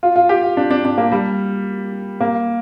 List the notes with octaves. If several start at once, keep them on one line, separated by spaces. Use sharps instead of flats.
F4
F4
G4
F4
D4
D4
D4
A#3
G3
A#3